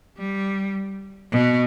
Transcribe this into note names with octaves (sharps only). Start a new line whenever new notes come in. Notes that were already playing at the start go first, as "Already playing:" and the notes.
G3
B2